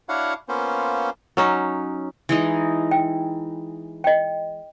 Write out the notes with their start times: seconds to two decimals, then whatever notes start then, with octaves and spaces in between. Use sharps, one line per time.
0.09 D4 E4 F#4 C#5 F5 F#5
0.49 A#3 B3 C#4 F4 C5
1.37 F#3 C#4 D#4
2.29 E3 G#3 D#4
2.91 G5
4.04 D#5 G5